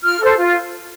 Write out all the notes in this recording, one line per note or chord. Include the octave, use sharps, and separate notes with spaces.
F4 F6
A4 C5
F4